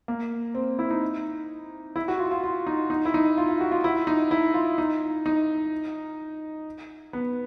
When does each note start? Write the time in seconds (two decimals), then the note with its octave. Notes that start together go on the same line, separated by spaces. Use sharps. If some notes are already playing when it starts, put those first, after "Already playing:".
0.08 A#3
0.55 C4
0.79 E4
0.90 D#4
1.96 E4
2.08 F#4
2.19 F4
2.31 F4
2.44 F4
2.67 D#4
2.90 D#4
3.05 E4
3.14 D#4
3.38 F4
3.49 F4
3.61 F#4
3.72 F4
3.84 E4
4.07 D#4
4.31 E4
4.54 F4
4.78 D#4
5.26 D#4
7.13 B3